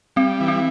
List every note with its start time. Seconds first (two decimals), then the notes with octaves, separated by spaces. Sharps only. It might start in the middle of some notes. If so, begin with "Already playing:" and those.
0.16 G3 C4
0.40 E3
0.48 C4